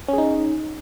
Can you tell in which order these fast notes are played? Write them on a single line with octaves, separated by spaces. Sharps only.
C#4 G#4 D#4